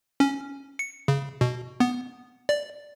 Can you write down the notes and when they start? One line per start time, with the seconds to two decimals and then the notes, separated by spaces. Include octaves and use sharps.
0.20 C#4
0.79 C#7
1.08 C#3
1.41 B2
1.80 B3
2.49 D5